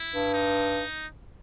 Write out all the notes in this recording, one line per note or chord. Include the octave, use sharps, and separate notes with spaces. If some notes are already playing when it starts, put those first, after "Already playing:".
Already playing: E4
G2
D#4